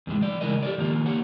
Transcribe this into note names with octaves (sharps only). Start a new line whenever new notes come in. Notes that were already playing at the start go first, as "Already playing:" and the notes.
E2 A2 G#3
F3 D5
C#3 E3 G#3 A3 A#4 D#5
G4 A4 A#4 C#5 D5
D#3 F3 A#3 F4
A#3 G4 C#5 F#5